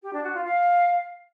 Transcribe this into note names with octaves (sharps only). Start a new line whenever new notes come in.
G4
D4
F#4
F4
F5